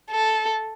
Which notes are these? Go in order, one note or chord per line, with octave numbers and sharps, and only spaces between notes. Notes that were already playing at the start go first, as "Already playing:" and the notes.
A4